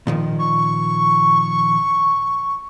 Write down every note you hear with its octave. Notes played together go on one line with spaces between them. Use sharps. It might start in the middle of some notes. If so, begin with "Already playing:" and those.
A#2 D#3 F3
C#6